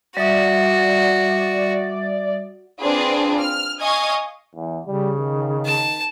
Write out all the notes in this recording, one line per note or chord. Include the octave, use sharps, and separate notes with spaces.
G3 F#4 D5 E5 D#6
C4 D4 F4 G#4 B4 D5
F6
D#5 F5 G#5 C#6 D#6 G#6
E2
C#3 G3
D#3
A5